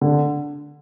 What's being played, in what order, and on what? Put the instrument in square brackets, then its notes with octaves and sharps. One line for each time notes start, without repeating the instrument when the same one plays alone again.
[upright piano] D3